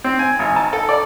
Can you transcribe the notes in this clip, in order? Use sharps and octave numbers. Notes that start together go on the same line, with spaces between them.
C4
G#5
G#1
A5
A4
D5